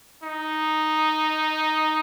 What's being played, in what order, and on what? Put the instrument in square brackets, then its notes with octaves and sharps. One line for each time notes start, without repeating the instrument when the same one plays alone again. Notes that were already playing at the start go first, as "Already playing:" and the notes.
[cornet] D#4